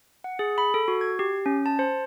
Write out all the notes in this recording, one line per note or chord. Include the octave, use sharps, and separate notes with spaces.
F#5
G#4
B5
A4
F#4
G#6
G4
C#4
A5
C5